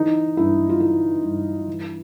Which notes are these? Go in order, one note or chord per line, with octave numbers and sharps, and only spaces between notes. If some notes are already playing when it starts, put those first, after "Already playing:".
Already playing: E3 D#4
G2 E4
F4
E3 E4
G2
E3